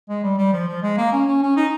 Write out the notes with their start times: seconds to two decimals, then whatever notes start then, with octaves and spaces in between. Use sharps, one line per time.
0.09 G#3
0.23 G3
0.38 G3
0.53 F3
0.67 F3
0.82 G#3
0.97 A#3
1.12 C#4
1.27 C#4
1.42 C#4
1.56 D#4